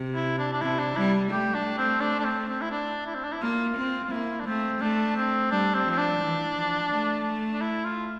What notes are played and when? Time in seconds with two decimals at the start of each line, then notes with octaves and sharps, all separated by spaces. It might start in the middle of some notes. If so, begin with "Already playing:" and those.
Already playing: C3
0.15 E4
0.39 D4
0.53 D4
0.61 C3 E4
0.79 D4
0.97 G3 E4
1.31 A3 G4
1.54 D4
1.78 C4
2.01 D4
2.19 D4
2.25 C4
2.48 C4
2.61 E4
2.71 D4
3.07 E4
3.15 C4
3.24 D4
3.33 E4
3.42 A#3 F4
3.77 C4
4.04 F4
4.11 A#3 E4
4.40 D4
4.46 A3 C4
4.81 A3 D4
5.16 C4
5.51 G3 D4
5.75 C4
5.86 F3 C4
5.98 D4
6.21 E3
6.56 F3
6.92 A3
7.53 D4
7.61 E4
7.84 F4